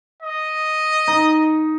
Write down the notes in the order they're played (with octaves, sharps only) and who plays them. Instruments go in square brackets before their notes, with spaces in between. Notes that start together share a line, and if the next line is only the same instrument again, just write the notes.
[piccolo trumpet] D#5
[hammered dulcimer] D#4